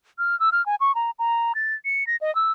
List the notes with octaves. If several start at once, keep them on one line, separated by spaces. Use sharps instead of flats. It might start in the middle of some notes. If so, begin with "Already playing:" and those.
F6
E6
F6
G#5
C#6
A#5
A#5
A6
C#7
A#6
D#5
E6